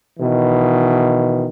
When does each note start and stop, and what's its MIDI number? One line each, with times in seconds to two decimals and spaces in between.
0.20 1.48 47
0.20 1.48 51
0.20 1.48 52